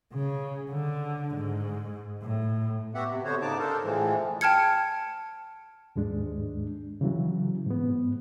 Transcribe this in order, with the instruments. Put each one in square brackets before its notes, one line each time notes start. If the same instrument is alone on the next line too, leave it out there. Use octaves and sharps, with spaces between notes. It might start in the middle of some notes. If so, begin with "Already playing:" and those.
[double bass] C#3
D3
G#2
A2
[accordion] B3 F#4 G4 E5 F#5
C3
D3 B3 F#4 C5 C#5
G#2 C#3 D#4 A5 D6
D4 A4 A#4 C5
A2 E3 F3 G#3
[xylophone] G5 A5 F6 G#6 C#7
[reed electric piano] D#2 G#2 G#3 D4
C#3 E3 F#3
G#2 B3